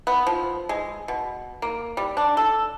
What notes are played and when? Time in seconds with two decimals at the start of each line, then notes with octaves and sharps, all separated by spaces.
0.07 B3
0.27 F3
0.69 G#3
1.08 B2
1.62 A#3
1.97 G3
2.17 D4
2.37 A4